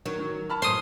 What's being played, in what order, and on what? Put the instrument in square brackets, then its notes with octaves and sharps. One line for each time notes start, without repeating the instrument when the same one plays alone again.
[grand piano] D#3 [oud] F#3
[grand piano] D#3
A5 B5 F6
[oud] F#2 A2 C5 [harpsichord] C6 D#6